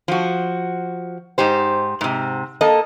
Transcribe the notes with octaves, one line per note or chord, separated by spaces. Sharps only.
F3 F#4
G#2 D#4 G4 C5
G#2 C3
A#3 A4 D#5